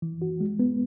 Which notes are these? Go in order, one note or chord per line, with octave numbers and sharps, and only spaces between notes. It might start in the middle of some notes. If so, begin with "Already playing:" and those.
E3
F#4
G#3
B3